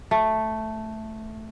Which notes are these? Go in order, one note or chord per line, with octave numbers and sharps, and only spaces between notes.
A3